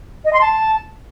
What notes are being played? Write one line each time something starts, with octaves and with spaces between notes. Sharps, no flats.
D#5
C6
A5